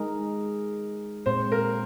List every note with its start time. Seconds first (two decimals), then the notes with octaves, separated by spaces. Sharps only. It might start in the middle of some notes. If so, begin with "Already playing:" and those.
Already playing: G#3 D#4 G#4 A#4
1.26 A#2 G#3 C4 C5
1.52 A#4